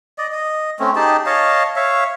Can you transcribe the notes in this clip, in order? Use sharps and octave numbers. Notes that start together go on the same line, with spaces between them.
D5 D#5
D#5
A3 C4 C#4
D#4 G4 G#4 A5
C#5 D#5 F5 A5
C#5 E5 F5